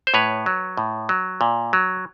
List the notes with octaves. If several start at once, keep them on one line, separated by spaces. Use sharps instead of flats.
C5
A2 B4 C#5
F#3
A2
F#3
A#2
F#3